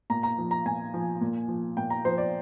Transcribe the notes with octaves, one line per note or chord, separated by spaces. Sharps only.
A#2 A#5
A#5
F3
A#5
A#2 G#5
F3
A#2
F3
A#2 G5
A#5
F3 C5
D5